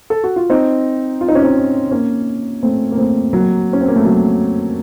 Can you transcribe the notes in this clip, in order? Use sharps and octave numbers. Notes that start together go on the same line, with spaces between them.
A4
F#4
F4
C4 D#4
F4
D#4
C#4
C4 D#4
A#3 C#4
A3 C4
A#3
A3 C4
F#3 A#3
C#4
C4
A#3
A3
F#3